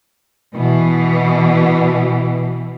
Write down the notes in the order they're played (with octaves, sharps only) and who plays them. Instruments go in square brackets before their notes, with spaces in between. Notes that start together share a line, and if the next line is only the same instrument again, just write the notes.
[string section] B2 E3